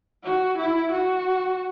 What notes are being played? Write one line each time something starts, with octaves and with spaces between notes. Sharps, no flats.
F#4
E4
F#4